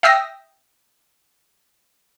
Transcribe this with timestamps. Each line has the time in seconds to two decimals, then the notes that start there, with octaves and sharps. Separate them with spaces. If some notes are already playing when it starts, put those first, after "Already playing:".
0.03 E5 G5 D#6 E6 A#6